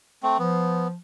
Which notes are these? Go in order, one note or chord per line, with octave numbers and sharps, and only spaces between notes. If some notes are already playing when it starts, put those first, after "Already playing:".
A3 C4
F3 B3